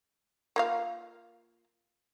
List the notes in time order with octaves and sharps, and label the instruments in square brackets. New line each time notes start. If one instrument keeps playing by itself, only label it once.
[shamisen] A#3 F4 F5